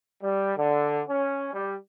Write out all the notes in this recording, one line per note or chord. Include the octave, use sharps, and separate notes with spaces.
G3
D3
C#4
G3